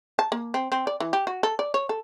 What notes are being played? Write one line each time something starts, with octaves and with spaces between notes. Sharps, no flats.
A5
A#3
C4
C4
D5
E3
G4
F#4
A4
D5
C#5
A4